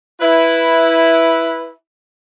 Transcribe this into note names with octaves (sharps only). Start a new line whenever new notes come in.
E4 B4